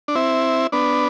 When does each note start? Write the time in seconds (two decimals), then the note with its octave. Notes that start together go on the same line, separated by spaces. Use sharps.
0.08 D4
0.15 C4 E4
0.72 B3 D4